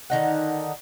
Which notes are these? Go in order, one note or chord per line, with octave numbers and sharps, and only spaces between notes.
D3 D#3 D#4 F#5